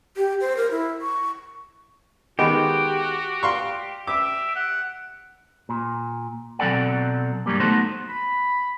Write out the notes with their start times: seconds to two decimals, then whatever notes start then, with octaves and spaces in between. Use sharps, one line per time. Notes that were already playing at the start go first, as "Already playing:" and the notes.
0.17 G4
0.41 C5
0.57 A#4
0.71 E4
1.01 C#6
2.39 D#3 G#3 B3 F#4 G4
3.43 F5 C6 C#6
4.07 E5 D6
4.56 F#5
5.69 A#2
6.59 B2 F#3 C4 A4 D5 F#5
7.46 G2 C#3 F#3 G3 A#3
7.60 A3 B3 D#4 F#4 A4 C5
8.10 B5